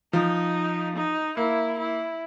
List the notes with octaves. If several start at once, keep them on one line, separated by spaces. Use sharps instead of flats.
F3 D#4
D#4
A#3 E4
E4